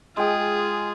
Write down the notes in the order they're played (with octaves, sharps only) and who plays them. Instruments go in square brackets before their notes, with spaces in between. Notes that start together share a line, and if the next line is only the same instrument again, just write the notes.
[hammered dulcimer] G#3 G5 [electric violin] F4 G#4